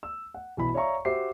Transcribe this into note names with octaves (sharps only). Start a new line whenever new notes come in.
E6
F#5
B1 E3 E4 B5
C#5 D5 E5 F5 A#5 C#6
F#4 G4 C5 E5 D6 C7